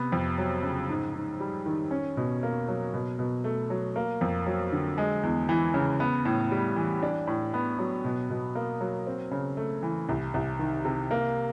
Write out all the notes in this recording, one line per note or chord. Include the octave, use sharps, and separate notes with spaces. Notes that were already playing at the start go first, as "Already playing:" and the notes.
Already playing: C3 B3
F2
F#3
C#3
G#2
G#2
G3
D#3
C#4
B2
A#3
F#3
B2
B2
A3
F#3
A#3
F2
F#3
D3
G#3
E2
E3
C#3
B3
A2
G3
E3
D4
A2
B3
F#3
B2
B2
A#3
F#3
C4
C#3
A3
E3
C2
C2
D#3
C3
A#3